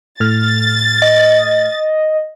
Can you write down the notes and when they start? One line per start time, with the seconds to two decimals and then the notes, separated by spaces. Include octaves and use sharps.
0.20 A2 F6 A6
1.02 D#5